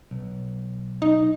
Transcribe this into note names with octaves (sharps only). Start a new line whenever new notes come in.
B1
D#4